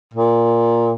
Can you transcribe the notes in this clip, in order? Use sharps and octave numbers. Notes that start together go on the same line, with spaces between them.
A#2